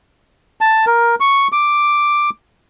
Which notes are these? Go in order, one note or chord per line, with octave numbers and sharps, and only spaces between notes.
A5
A#4
C#6
D6